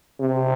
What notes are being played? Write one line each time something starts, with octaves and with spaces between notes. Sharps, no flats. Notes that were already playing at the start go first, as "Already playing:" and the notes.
C3